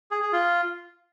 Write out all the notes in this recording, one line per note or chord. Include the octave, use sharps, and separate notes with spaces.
G#4
G#4
F4